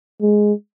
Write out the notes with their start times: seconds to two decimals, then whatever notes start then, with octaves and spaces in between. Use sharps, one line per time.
0.21 G#3